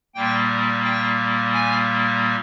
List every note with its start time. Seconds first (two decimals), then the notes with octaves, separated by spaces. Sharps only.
0.15 A#2 G3 A#3 G5
0.84 G5
1.53 G#5